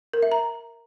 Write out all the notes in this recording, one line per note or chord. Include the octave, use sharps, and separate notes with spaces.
A#4
E5
A#5